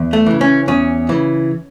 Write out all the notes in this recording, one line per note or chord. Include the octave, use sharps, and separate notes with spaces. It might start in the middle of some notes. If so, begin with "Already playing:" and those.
Already playing: E2
A3
C#3 E3
C#4
E2 C#4
C#3 E3